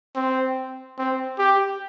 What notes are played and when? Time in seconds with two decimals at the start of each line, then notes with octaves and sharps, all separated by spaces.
0.16 C4
0.98 C4
1.39 G4